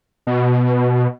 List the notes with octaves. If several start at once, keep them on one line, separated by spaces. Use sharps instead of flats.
B2